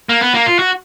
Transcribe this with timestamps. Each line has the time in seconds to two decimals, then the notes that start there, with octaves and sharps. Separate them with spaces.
0.09 A#3
0.21 B3
0.34 A#3
0.46 F4
0.59 F#4